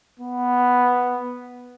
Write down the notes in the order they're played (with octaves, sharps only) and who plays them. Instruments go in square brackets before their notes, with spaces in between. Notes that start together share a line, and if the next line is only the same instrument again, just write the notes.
[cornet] B3